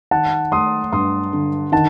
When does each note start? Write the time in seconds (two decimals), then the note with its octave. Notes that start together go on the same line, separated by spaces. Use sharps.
0.11 D#3 F#5 A5
0.52 A3 C6 D#6
0.92 G2 C6 D#6
1.33 D3
1.72 D#3 F#5 A5